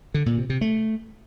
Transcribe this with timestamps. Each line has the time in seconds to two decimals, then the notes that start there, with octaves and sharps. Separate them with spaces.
0.14 D3
0.26 A#2
0.38 C3
0.50 C3
0.61 A3